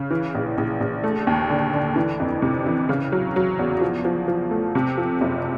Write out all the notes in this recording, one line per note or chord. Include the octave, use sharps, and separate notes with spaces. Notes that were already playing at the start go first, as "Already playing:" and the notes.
Already playing: C#3
E3
A#1
A#1
A#1
A3
D#2
D3
D3
E3
F2
C3
E3
C#3
F#3
F#3
E2
F3
F3
F3
A3
C3
F3
F#1